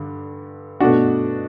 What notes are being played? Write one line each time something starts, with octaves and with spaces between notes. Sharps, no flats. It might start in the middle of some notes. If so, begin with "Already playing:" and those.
Already playing: G2 D3
B2 A3 D4 F#4